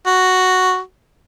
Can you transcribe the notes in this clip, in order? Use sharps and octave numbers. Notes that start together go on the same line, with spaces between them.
F#4